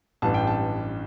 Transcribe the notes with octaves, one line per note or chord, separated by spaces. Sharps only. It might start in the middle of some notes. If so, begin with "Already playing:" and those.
A1 G2 E3 A5
G5
A5